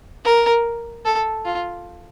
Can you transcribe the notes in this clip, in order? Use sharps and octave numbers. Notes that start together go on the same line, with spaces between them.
A#4
A4
F4